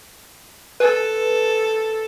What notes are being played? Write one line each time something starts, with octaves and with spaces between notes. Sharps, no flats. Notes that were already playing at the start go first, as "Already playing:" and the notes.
A4 B4